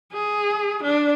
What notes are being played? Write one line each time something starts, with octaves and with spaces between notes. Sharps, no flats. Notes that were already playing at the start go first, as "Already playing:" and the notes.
G#4
D4